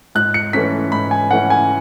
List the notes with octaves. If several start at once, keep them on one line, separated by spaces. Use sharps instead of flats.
G#2 F#6
C#7
E3 A3 C#4 B6
G#2 B5
G#5
E3 A3 C#4 F#5
G#5